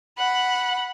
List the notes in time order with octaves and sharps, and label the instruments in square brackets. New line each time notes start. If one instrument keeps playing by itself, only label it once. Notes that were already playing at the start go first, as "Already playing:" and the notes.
[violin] F#5 B5